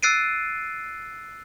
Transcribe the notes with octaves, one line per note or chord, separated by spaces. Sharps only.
E6 F#6 A6 C7 D7 D#7